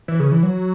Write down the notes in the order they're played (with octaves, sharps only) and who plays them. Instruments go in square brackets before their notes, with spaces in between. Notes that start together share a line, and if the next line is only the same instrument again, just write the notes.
[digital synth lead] E3
C#3
E3
F#3